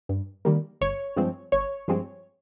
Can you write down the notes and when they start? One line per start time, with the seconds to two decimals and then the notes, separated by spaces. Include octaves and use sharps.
0.09 G2
0.45 D#3 G3 A#3
0.81 G1 C#5
1.16 G2 F3 G#3 C4
1.52 G1 C#5
1.88 G2 F3 G#3 C4